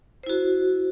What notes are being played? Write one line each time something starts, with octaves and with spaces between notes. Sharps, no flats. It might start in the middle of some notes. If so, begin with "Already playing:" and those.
E4 F#4 C5